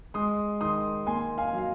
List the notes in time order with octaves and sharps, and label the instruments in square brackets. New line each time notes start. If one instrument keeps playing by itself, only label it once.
[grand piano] G#3 C6 D#6
D#3 C6 D#6
A#3 G#5 C6
F5 G#5
F#3 F5